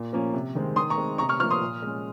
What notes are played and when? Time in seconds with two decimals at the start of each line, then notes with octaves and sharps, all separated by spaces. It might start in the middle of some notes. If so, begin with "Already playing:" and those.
Already playing: A#2
0.13 F3 A#3 C#4
0.33 C3
0.55 D#3 G#3 C4
0.76 D#3 C6 D#6
0.90 A#5 C#6
0.98 G#3 C4
1.18 C3 A#5 C#6
1.29 C#6 F6
1.40 F3 C#6 F6
1.43 A#3
1.50 C6 D#6
1.61 A#2
1.82 G#3 C#4